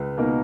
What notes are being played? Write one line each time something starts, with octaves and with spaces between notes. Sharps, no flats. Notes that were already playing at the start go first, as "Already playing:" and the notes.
Already playing: C#2 B4
B2 A#3 D#4 A#4